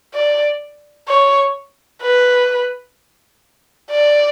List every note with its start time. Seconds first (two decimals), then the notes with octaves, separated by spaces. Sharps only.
0.14 D5
1.08 C#5
2.02 B4
3.90 D5